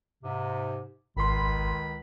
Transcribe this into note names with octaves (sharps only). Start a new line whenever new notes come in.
G#2 C3
G#1 C#2 D#3 B5 C6